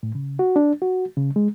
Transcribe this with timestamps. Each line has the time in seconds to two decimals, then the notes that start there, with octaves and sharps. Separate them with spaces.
0.03 A2
0.15 C#3
0.39 F#4
0.56 D4
0.82 F#4
1.17 C#3
1.36 G#3